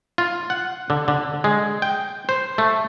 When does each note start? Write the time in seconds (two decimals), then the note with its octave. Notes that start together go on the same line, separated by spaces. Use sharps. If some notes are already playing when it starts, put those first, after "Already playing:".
0.18 F4
0.50 F#5
0.90 D3
1.08 D3
1.44 G#3
1.82 G5
2.29 C5
2.58 A3